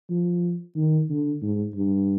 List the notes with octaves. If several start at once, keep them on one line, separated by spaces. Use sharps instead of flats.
F3
D#3
D3
G#2
G2